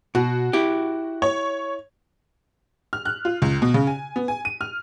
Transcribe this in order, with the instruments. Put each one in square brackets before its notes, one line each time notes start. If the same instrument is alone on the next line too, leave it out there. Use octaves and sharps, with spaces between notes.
[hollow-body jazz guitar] B2 [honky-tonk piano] F#4
[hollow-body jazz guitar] E4 G4
[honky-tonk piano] C#5
F6
F#6
F4
C#2
B2
C#3
G#5
B3
G#5
D#7
F6